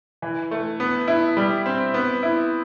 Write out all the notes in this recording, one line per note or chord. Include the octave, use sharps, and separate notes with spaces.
E3
A3
B3
E4
G3
C4
B3
E4